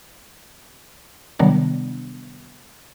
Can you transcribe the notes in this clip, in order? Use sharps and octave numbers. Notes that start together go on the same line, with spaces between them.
C3 D#3 F#3 G3 B3 D4